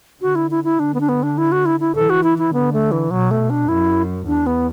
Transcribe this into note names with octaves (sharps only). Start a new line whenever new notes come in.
D3 F#4
E4
E4
E4
D3 D4
B3
D4
B3
D4
E4
F#4
E4
E4
E3 A4
F#4
E4
E4
D3 B3
A3
E3
B2 F#3
A3
D4
F#2 E4
E2 D4
B3